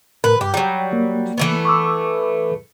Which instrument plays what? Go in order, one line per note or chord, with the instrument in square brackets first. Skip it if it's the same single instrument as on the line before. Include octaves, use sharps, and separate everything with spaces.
[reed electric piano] A2 A#4 [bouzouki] B4
[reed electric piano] G2 [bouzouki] G4
[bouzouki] F#3 G3 [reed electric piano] G5
[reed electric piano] A#3
[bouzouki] E3 A3 B3
[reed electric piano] C#6 D6 E6